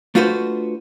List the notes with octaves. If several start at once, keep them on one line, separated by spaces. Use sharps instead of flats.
A3 D4 F4 F#4 B4 C5